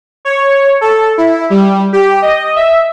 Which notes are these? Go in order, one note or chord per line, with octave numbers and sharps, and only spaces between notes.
C#5
A4
E4
G3
G4
D#5
E5